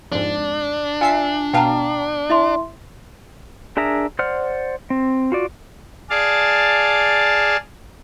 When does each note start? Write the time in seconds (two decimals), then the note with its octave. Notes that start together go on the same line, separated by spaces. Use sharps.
0.12 F2 G#2 D4
1.01 F4 E5 G#5 C7
1.53 B2 F5 G5 A5 A#5
2.30 E4 E5 C6
3.77 D4 G#4 A#4 E5 A#5
4.19 C5 D5 F#5 F6
4.90 C4
5.32 F4 F#4 D5
6.10 G#4 D5 F5 A5